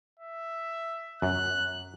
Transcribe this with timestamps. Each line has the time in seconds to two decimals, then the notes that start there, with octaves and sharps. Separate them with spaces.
0.20 E5
1.22 F#2 F#6